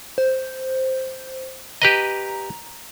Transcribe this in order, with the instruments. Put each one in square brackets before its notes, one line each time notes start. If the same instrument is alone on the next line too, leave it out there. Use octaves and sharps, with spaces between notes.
[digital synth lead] C5
[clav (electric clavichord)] G4 B4 D#5 [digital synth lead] A#5